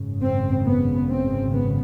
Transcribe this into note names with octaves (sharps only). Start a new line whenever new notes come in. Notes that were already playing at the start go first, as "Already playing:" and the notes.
Already playing: G#1 F#2 C#3
C4
B3
C4
B3